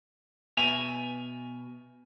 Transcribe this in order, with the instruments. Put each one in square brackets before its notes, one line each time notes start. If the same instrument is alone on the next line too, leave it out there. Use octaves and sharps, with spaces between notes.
[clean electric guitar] B2 E5 G#5 [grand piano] D#7 F7